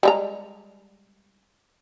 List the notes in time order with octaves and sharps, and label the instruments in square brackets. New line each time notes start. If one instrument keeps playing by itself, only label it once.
[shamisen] G3 G#3 A#5